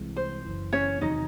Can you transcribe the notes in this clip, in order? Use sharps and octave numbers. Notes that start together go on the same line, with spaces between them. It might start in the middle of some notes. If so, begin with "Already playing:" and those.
Already playing: C2 C3 E3 G#3
C5
F#1 F#2 E3
C#4 C#5
E2 C3 D#3 F#3 D#4 D#5